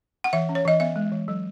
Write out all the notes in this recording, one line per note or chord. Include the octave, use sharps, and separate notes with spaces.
F#5
E3 E5
C#4
C#5
E3 D#5
B3 E5
G#3
E3
F#3